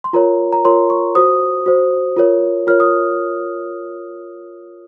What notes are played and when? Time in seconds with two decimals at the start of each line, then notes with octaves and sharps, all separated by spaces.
0.04 C6
0.13 F4 A#4 C#5 A#5
0.53 A#5
0.65 F4 A#4 C#5 C6
0.90 C#6
1.15 F#4 C5 D#6
1.66 F#4 C5
2.17 F4 A#4 C#5
2.67 F4 A#4 C#5 F6
2.80 D#6